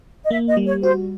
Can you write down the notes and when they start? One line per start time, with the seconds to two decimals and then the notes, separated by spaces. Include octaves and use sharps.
0.24 D#5
0.31 A#3 E5
0.49 D#5
0.57 G3
0.66 C#5
0.82 F#4 C5